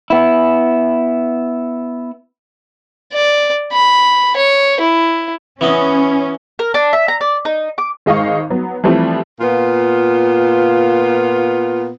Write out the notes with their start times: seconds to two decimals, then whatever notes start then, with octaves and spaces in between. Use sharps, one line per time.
0.10 B3 E4
3.13 D5
3.72 B5
4.36 C#5
4.80 E4
5.61 E3 B3 C#4 D#5
6.59 A#4
6.74 D4
6.93 E5
7.08 A#5
7.21 D5
7.45 D#4
7.78 D6
8.06 G#1 G#3 D#5 F5 C#6
8.50 F#3 B3
8.84 E3 F3 G3 A3 C4
9.40 A#2 B3 F4